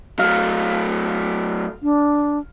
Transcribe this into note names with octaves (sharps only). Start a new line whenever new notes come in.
F#3 A3 F5
D4